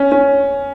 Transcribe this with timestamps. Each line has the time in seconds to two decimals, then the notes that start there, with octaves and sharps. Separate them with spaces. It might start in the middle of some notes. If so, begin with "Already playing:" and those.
Already playing: C#4
0.12 C#4